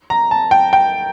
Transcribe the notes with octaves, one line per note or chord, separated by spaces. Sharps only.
A#5
A5
G5
G5